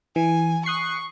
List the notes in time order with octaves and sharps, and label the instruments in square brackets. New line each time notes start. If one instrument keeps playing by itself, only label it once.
[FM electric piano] E3 [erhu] G#5
[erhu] C#6 [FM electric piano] D#6 F#6 C7